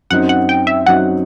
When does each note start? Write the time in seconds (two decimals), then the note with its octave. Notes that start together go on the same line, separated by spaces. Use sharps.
0.10 F#2 F#3 C4 D#4 F#5
0.29 F#5
0.49 G5
0.67 E5
0.86 F#2 F#3 C4 D#4 F#5